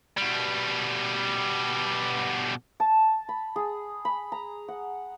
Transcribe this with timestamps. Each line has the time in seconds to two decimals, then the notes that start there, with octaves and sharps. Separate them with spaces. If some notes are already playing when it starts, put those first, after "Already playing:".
0.18 B2 G3
2.80 A5
3.29 B5
3.56 G#4
4.05 B5
4.32 A#5
4.68 F#5